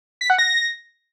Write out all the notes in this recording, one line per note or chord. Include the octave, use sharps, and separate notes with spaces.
B6
F#5
A#6